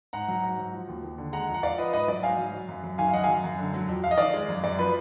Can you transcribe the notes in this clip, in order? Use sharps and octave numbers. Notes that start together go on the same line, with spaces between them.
G#2 F#5 A#5
F#3
G#2
F#3
F3
D#2
D#2
D3
G#3 F#5 A#5
F2
F#5
F2 D5 F5
F3 B4 D#5
G#2 B4 D#5
F#3 D5
G#2 F5 G#5
F#3
F#3
F#2
F#2
D#3 F5 G#5
F5
F#3 D#5 F#5
F5 G#5
F#2
F#2
D3
F#3
F2
F2 F5
D#5
D#3 D5 F5
G#3
F#2
F#2 D5
F3 B4